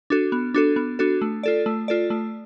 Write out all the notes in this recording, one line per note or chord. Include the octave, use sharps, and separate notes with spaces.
D4 F#4 A4
B3
D4 F#4 A4
B3
D4 F#4 A4
A3
F4 A4 D5
A3
F4 A4 D5
A3